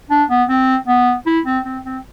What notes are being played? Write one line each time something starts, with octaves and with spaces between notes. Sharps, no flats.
D4
B3
C4
B3
E4
C4
C4
C4